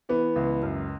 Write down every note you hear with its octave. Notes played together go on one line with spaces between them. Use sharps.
E3 B3
C#2
F#2